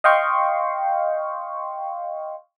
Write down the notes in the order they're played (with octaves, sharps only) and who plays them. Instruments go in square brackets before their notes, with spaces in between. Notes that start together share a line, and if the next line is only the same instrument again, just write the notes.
[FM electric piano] D#5 F5 G5 C6 C#6